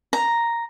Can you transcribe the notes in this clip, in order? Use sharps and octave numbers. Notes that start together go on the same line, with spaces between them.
A#5